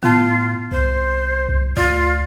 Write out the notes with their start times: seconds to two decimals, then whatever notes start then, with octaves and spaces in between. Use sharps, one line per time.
0.03 A2 B3 F4 A5
0.72 C2 C5
1.49 C2
1.77 D2 F4 D5